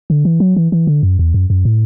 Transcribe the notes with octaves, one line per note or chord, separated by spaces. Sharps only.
D3
E3
F#3
E3
E3
D3
F#2
E2
F#2
F#2
A2